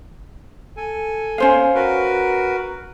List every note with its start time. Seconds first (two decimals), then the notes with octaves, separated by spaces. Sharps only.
0.77 A4 G#5
1.38 C#4 C5 F5
1.74 F#4 A#4 B4